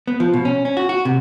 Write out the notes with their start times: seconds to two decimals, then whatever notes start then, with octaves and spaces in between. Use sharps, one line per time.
0.07 B3
0.20 F3
0.33 B2
0.45 C#4
0.65 C#4
0.77 F#4
0.89 F#4
1.05 C3